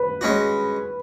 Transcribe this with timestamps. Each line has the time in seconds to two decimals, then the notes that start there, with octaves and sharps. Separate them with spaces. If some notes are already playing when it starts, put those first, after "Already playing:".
Already playing: B4
0.21 G#3 C#4 F#4